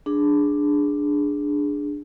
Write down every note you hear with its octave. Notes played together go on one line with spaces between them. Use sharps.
D4 G#4